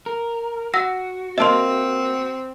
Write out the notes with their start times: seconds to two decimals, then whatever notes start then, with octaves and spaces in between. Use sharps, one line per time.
0.06 A#4
0.74 F#4 F#5 E6 A#6
1.38 A#3 C4 D#5 E5 A5 C6